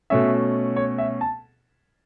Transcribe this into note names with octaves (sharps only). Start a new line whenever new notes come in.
B2 A3 C#4 E5
C#5
E5
A5